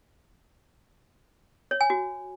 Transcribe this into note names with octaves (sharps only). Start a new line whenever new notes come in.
C#5
G#5
F#4